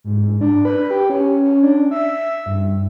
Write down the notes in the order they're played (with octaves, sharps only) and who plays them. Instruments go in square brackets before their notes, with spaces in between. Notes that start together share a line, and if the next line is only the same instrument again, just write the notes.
[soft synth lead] G#2
G#2
D4
B4
G4
C#4
C#4
D4
E5
G2